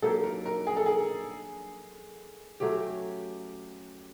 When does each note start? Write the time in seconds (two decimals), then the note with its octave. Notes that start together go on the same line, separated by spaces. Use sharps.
0.02 F#3 A#3 D4 G4 A4
0.24 A#4
0.46 A#4
0.67 G#4
0.77 A4
0.86 G#4
2.60 F#3 A3 C#4 G4